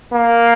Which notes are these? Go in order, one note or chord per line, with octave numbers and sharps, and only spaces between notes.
A#3